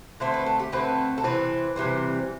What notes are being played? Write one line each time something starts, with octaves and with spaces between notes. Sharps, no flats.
D3 A3 C4 C5
B4
A4
G4
D3 A3 C4 B4
A4
C3 E3 C4 B4
C3 E3 G3 C4